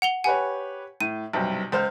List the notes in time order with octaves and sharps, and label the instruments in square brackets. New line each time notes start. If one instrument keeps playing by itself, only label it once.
[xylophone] F#5 F7 G7
[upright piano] G4 B4 C#5 [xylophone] F#5 G#5
[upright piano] A2 [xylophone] D#7
[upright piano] B1 G2 C3
C#2 C5 F6